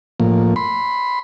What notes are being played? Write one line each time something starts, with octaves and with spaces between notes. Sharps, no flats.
A2 F3 A#3
B5 C6